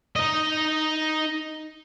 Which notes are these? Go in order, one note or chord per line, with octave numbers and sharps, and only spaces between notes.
D#4 D#5